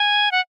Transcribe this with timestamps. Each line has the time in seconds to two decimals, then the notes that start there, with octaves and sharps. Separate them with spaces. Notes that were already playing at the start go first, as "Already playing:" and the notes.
Already playing: G#5
0.32 F#5